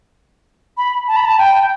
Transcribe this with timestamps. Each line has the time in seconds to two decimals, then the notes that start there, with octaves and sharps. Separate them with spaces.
0.77 B5
1.08 A5
1.16 B5
1.25 A5
1.38 G5